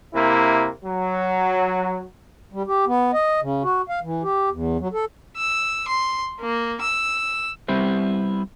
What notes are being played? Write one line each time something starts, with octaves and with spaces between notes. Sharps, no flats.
C3 A#3 E4
F#3
G3
G4
B3
D#5
C#3
F#4
F5
E3
G4
E2
F#3
A4
E6
C6
A#3
E6
G3 B3 C4 E4 G4 C5